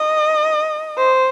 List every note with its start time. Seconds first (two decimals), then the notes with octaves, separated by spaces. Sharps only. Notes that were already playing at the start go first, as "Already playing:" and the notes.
Already playing: D#5
0.97 C5